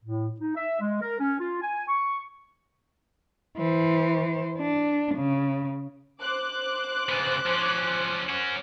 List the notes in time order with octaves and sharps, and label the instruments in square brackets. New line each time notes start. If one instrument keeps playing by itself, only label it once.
[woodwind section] A2
D#4
E5
G#3
A#4
C#4
F4
G#5
C#6
[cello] E3 C5
D4
C#3
[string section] C5 D6 F#6
[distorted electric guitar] C#3 B3
F3 C#4
C#4 F#4